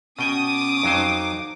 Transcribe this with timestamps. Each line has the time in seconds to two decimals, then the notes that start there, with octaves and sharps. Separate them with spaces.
0.19 B2 C#4 G5 G#5 D#6
0.47 D6
0.84 F2 F#3 D#4 C5